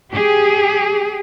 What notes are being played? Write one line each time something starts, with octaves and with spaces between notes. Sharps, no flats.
G4 G#4